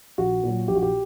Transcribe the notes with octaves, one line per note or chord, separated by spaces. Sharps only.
A#1 F#4
A#2 F#3
A#1 G4
F#4
G4